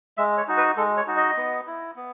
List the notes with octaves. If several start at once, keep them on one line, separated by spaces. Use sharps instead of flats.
G#3 E5
C#5
D#4 F#4
B4
G#3 A4
C#5
D#4 F#4
D#5
B3
E4
B3